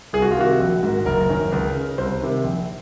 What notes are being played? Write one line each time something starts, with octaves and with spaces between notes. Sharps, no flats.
C2 G#4
F#4
F4
C3 D#3 F#4
A#1
G#2 D#3
F#1 A#4
F#2 D#3
C#2
C#3
C2 C5
C3 D#3
A#1